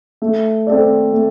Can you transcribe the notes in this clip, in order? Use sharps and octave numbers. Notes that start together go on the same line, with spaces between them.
A3
C4 A4 D5
A3